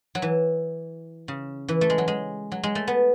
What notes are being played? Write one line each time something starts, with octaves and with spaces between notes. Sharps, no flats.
F#3
E3
C#3
E3
A3
G#3
F#3
G#3
F#3
G#3
A3
B3